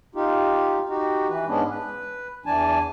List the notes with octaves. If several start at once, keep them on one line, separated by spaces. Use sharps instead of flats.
D#4 F4 G4
D#4 F#4 G4
E3 B4
G#2 G#3 B3 C#4 D4
B4
E2 E3 D4 G#5 A5